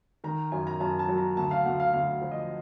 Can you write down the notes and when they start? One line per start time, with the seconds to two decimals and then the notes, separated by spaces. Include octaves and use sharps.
0.24 D#3 A#5
0.52 F#2 G#5
0.67 A#5
0.80 F#2 A5
0.99 A5
1.08 F#3
1.18 A#5
1.37 D2 A5
1.51 F5
1.65 D2 F#5
1.80 F5
1.94 D2 F5
2.22 F3
2.32 D#5